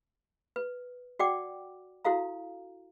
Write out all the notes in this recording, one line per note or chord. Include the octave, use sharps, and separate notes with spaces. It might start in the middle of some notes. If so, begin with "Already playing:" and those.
B4
F#4 D5 F#5 G5 D6
E4 F#4 A4 F5 A#5